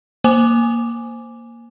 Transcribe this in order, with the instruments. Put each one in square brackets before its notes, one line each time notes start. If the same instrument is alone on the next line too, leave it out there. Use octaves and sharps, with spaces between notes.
[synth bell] A#3 C5 G#5 D6